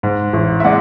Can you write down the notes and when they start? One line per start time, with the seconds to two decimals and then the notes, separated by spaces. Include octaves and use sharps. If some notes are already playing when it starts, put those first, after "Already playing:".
0.03 G#2
0.33 A1
0.60 E5
0.64 G#3 D5 F#5